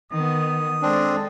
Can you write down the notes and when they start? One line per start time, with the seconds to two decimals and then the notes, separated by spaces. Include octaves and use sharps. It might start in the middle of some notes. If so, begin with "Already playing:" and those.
0.12 D#3 B3 D#6
0.82 G#3 C4 D4 A4